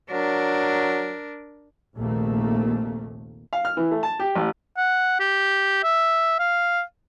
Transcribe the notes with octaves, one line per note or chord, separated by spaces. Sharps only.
F#3 D4 A#4
A#1 D#2 C3 A3 A#3
F5
F6
E3
A3
A5
G4
A1
F#5
G4
E5
F5